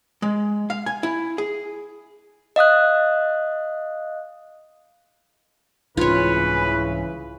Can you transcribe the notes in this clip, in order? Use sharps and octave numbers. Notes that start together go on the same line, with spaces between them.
G#3
F5
G#5
E4
G#4
D#5 F5 D#6 F#6
C2 G#2 C#3 E3 F4 B4 C#5